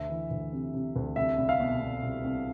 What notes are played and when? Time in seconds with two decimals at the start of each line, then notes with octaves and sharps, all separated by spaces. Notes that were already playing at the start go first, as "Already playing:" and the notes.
Already playing: D2 E5
0.10 E3
0.31 D2
0.53 C3
0.74 C3
0.96 D2
1.16 C2 E5
1.38 C2
1.49 F5
1.60 B2
1.81 B2
2.03 C2
2.24 C2